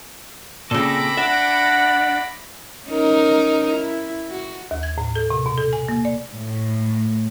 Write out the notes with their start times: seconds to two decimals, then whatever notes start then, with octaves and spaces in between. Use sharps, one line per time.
0.71 A#2 C#3 C4 A4 B5 D6 A#6
1.17 D4 E5 F#5
2.88 C#4 D#4 A#4
3.76 E4
4.30 F#4
4.71 D#2
4.83 G#6
4.98 A2
5.16 A4
5.30 C3
5.46 B2
5.58 A4
5.73 G#5
5.88 A#3
6.05 D5
6.34 A2